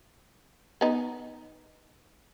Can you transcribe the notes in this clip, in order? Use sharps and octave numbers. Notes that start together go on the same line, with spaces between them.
B3 D#4